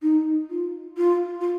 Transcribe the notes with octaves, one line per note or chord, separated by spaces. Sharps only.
D#4
F4
F4
F4